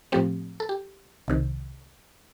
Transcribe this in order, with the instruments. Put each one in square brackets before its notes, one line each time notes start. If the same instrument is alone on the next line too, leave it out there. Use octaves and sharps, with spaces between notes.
[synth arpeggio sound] A2 F3 A3 C4 G4
A4
G4
C2 C3 D#3